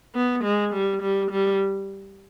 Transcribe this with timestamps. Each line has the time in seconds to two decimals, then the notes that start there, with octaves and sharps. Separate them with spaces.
0.15 B3
0.44 G#3
0.73 G3
1.02 G3
1.31 G3